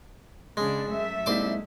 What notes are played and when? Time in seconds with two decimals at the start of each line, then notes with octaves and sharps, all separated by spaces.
0.57 C#3 G#3 D4
0.89 F#2 A3 E5
1.26 C2 G#3 A#3 D#4 C6 D6